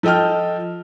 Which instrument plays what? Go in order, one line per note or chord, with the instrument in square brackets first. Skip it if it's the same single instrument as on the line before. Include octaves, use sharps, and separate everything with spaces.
[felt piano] F3 A4 D#5 G5 F6